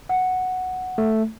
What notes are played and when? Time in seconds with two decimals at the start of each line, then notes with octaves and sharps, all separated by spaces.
0.09 F#5
0.98 A3